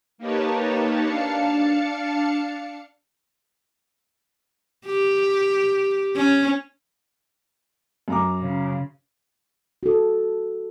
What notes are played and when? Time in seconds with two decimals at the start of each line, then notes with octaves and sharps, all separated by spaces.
0.18 A#3 D#4 G4 B4 C#5 A5
1.01 D4 F5 A5 C#7
4.86 G4
6.16 C#4
8.08 F#2 A#5 D6
8.41 C#3
9.83 F#4 A4